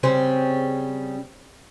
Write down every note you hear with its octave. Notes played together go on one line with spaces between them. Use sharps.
C#3 G3 C4